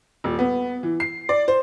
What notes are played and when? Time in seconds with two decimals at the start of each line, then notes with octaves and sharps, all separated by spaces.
0.24 D#1
0.39 B3
0.83 E3
1.00 C7
1.29 D5
1.48 C5